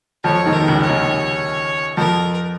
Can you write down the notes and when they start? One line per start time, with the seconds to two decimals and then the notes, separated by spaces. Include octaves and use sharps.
0.24 F2 F3 C#5
0.46 D#2 D#3
0.53 A#4
0.60 D#3
0.67 C#2 C#3
0.82 C#5
0.89 D#2 D#3
1.97 F2 F3 A#4